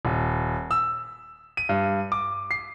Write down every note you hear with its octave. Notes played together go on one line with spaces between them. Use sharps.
D#1
E6
D#7
G2
D6
C7